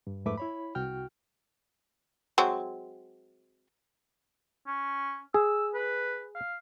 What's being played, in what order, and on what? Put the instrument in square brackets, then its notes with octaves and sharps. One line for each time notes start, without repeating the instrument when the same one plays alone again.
[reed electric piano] G2
F2 G#2 A3 B4 E5 D6
E4 C#5 B5
C2 F#4 G5 F6
[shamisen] F#3 G#3 C4
[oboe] C#4
[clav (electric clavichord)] G#4 [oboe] E6
[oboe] B4
F5